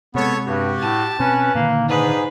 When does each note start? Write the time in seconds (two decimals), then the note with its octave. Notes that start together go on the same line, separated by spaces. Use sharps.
0.15 C3 G#3 B3 A4 C#5
0.47 G2 F#4 G4
0.79 A2 A5
1.20 B2 C4 C#4 B4
1.55 A#2 D3 D#3 A#3
1.89 G#2 D4 D#4 G#4 B4